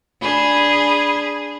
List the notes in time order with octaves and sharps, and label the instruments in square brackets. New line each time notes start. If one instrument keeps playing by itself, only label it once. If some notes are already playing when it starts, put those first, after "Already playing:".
[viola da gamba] D4 G#4 [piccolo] B5